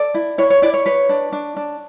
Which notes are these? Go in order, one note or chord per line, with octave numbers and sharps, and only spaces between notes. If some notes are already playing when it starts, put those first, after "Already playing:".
Already playing: A4 D5
E4
E4 C#5
C#5
E4 D5
C#5
B4 C#5
D4
D4
D4